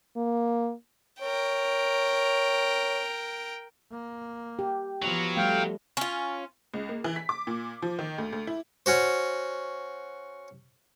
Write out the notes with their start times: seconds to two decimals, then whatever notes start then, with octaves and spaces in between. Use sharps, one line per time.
0.16 A#3
1.21 A#4 C#5 G5
3.91 A#3
4.59 G4
5.02 F3 F#3 B3
5.37 G3 A3 F5 G5
5.97 C#4 F4
6.74 C#2
6.89 A#3
7.04 E3
7.16 B6
7.29 D6
7.47 A#2
7.82 F3
7.99 D#3
8.18 D2
8.32 D2
8.47 E4
8.86 C#4 F#4 C5